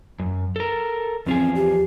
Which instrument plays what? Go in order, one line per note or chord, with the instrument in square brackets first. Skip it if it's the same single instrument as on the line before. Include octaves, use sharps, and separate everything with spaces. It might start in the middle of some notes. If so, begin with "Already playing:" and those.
[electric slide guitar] F#2
A4 A#4
[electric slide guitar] E2 F3 G#4 [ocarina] C4
[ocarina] G4